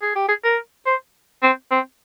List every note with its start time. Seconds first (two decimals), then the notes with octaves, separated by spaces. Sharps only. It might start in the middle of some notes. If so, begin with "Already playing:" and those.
0.02 G#4
0.15 G4
0.28 G#4
0.44 A#4
0.86 C5
1.43 C4
1.71 C4